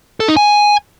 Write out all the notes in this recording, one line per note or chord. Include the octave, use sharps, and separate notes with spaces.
A4
D#4
G#5